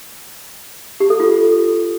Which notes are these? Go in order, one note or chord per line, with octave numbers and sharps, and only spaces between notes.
G4
A4
F4